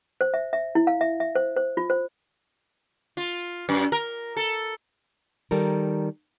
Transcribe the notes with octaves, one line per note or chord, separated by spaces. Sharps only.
C5
E5
E5
E4
F5
E5
E5
C5
C5
F4
C5
F4
F#2
A#4
A4
D#3 G3 A4 A#4